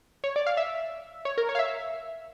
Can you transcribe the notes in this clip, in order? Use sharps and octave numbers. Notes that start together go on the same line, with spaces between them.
C#5
D5
F5
E5
C#5
A#4
C#5
F5
E5